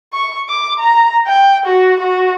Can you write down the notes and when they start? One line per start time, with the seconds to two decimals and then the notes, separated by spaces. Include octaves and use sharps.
0.13 C#6
0.49 D6
0.79 A#5
1.27 G5
1.66 F#4
2.00 F#4